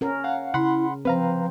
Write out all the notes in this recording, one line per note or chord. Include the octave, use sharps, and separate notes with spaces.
C#4 A#4
F5 F#5
C#3 E4 F#5 B5 C6
F3 C4 B4 F5 A#5